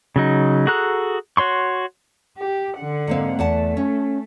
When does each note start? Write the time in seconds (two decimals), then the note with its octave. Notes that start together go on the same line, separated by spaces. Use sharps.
0.16 C#3 F#3 D#4
0.67 F#4 G#4 A4 A#5 F#6
1.37 F#4 C#5 C6 C#6
2.37 G4
2.77 D3 F#5
3.07 G#2 A#3 C4
3.39 E2 A3 F#5 A5
3.77 C#4